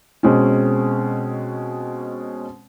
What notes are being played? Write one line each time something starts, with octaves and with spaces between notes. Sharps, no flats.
B2 G#3 C4 C#4